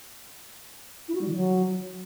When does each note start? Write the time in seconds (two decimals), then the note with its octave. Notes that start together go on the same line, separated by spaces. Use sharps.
1.08 E4
1.15 F#4
1.21 G3
1.28 D#3
1.34 F#3